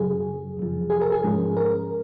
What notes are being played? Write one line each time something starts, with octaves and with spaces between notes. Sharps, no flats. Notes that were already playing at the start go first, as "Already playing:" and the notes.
Already playing: F#2 C#3 F#3 G#4
F2 C3 F3
G#4
A#4
G#4
G#2 F3 G#3 C#4
A#4